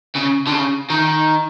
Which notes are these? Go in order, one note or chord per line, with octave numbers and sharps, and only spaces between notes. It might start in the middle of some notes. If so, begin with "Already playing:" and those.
C#3
D3
C#3
D#3